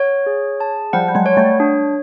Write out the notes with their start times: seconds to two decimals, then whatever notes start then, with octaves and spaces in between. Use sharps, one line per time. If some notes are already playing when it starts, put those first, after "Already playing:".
Already playing: C#5 F#5
0.26 G#4
0.60 A5
0.93 F3 G3 F#5
1.08 G3
1.15 F#3 G#3
1.26 C#5
1.37 G3 A3
1.60 D4